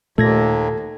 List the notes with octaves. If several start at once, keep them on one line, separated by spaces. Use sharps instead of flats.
D#2 A#2 A3 A4 G#6 A#6